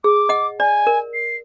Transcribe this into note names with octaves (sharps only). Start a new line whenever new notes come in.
G#4 D6
D#5 F#5
D5 G#5
A#4
C7